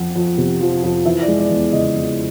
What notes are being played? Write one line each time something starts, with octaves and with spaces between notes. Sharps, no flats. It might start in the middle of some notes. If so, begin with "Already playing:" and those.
Already playing: F2 F3 F#5
F2
C3
F3
F2
E3 E5
D5
G#3
D5
E2
C#3 D#5
E3